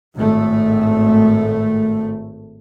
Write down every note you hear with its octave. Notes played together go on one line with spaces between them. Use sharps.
G#1 A2 A3